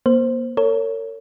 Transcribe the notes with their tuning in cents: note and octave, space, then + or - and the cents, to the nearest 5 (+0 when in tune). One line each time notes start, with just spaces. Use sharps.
A#3 +30 C5 +0
A#4 -40 C#5 +0